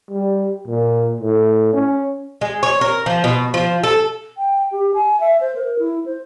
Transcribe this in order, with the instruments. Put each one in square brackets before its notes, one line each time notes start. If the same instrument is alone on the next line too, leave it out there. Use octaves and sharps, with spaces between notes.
[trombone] G3
A#2
A2
C#4
[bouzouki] G#3
C#5
A#4
F3
B2
F3
A4
[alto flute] G5
G4
G#5
E5
C5
A#4
E4
C5